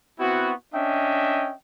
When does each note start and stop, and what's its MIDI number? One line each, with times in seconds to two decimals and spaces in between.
0.19 0.52 59
0.19 0.52 60
0.19 0.52 64
0.19 0.52 66
0.74 1.53 61
0.74 1.53 62
0.74 1.53 75
0.74 1.53 76
0.74 1.53 79